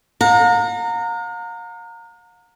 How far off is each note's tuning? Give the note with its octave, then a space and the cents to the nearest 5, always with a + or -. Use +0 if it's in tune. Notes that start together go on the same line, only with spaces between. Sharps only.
F5 +45 A#5 -20